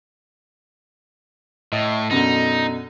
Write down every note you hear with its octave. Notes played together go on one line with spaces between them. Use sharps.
A2 D#5
F#2 B2 D3 D#4